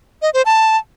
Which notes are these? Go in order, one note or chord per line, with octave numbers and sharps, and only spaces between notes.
D#5
C5
A5